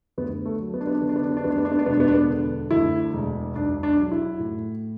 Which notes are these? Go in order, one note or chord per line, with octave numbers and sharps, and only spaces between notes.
D2 B3
A3
F#3
B3
D4
B3
D4
D3 B3
D4
B3
D4
B3
D4
D2 B3
D4
B3
D4
B3
D4
E1 B3
D4
B3
D4
B3
D3
D2 E4
E1
B1 D4
D4
F#3
E4
A2